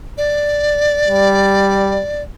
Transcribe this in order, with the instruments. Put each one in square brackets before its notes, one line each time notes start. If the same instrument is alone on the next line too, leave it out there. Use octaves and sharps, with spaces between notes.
[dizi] D5
[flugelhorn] G3